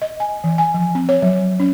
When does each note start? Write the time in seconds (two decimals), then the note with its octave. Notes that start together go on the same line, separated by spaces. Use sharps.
0.02 D#5
0.20 G#5
0.44 E3
0.58 G#5
0.74 F3
0.95 C4
1.09 C#5
1.22 F#3
1.60 C#4